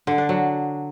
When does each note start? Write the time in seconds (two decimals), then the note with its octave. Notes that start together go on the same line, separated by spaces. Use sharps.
0.07 D3
0.18 D4
0.29 F#3